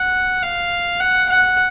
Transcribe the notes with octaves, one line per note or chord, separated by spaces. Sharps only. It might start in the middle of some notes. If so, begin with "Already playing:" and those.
Already playing: F#5
F5
F#5
F#5